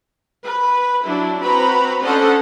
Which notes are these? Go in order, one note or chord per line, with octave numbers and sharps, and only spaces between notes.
B4
F#3 D4 E4
C4 F#4 B4 A#5 B5
C#4 D4 A4 C5 D#5 F#5